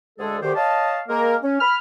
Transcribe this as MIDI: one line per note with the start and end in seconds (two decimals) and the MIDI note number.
0.19 0.37 38
0.19 0.37 56
0.19 0.37 68
0.19 0.37 69
0.42 0.55 38
0.42 0.55 51
0.42 0.55 67
0.42 0.55 72
0.56 1.00 73
0.56 1.00 75
0.56 1.00 77
0.56 1.00 81
1.09 1.36 56
1.09 1.36 58
1.09 1.36 70
1.43 1.61 61
1.61 1.77 83
1.61 1.77 89